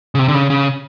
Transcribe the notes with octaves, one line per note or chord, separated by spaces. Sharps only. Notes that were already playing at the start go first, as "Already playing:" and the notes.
C#3
C3
D3
C#3
C#3